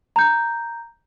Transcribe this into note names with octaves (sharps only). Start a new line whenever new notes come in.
A#5 G6